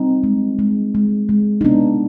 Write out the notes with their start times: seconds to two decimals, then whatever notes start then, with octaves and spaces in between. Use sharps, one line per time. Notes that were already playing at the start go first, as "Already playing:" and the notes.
Already playing: G3 C4 D#4
0.24 G#3
0.59 G#3
0.95 G#3
1.29 G#3
1.61 D#4
1.64 C3 B3 D4